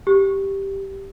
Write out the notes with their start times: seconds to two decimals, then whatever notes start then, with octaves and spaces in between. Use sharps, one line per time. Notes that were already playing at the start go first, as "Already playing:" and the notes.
0.07 G4